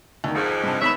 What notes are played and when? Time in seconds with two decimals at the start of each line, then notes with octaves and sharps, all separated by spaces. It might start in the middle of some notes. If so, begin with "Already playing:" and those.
0.24 D2 D#3
0.35 G#1 F2 G#2
0.63 G2 C3 A5
0.81 G#1 G#2 B3 C#5 E5 B5